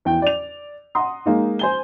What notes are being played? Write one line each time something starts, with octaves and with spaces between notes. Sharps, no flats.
E2 G5
D5 F7
F#5 A#5 C6 D#6
G#3 A#3 D#4
C5 G#5 G7